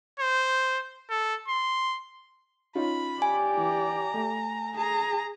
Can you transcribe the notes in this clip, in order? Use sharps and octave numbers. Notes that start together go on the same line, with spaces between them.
C5
A4
C6
C#4 D#4 F4 B5
G4 D5 G#5
E3 A#5
A3
G#4 A#5